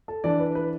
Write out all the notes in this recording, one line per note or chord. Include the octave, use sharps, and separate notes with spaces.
A4
E3 D4 D5
B4
B4